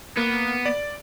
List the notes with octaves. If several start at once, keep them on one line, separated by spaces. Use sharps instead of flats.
A#3 B3
D5